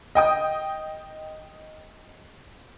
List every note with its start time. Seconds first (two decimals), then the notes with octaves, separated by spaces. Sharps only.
0.15 D#5 G5 D#6